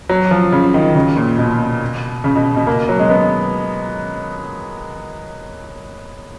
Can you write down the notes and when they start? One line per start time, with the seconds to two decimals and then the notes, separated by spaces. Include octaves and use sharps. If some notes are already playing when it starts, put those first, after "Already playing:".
0.09 F#3
0.31 F3
0.52 C#3
0.74 D#3
0.95 C#3
1.17 A#2
1.38 B2
2.24 C#3
2.36 B2
2.56 B2
2.67 A#3
2.89 F#3
2.99 G#3
3.10 B3